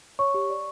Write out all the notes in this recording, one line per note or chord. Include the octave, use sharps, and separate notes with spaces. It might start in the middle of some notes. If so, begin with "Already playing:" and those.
C#5 C#6
G4
D5